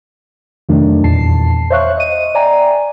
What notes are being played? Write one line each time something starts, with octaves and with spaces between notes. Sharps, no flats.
F2 C3 D#3 F#3 A3 D4
E2 A#2 A5 C7
C5 C#5 E5 F5 C#6 F#6
D#5 D#7
D5 E5 G5 G#5 A#5